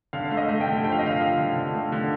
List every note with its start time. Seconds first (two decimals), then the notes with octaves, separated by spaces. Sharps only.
0.13 D3 F5
0.31 A3
0.37 D#5
0.48 A3
0.61 G5
0.67 D3
0.84 F3 G5
0.92 F5
0.99 D#5
1.02 D3 F5
1.20 F3
1.38 D3
1.56 D3
1.74 A3
1.92 D3